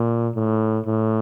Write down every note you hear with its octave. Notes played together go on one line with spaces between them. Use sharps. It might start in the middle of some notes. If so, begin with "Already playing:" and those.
Already playing: A#2
A2
A2